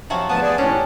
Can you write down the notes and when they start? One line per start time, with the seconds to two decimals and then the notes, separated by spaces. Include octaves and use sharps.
0.10 C3 F3 F#3
0.29 D2 F3 B3 A5 D#6
0.42 G#4 D5
0.58 D#2 A2 C#4 D4 G4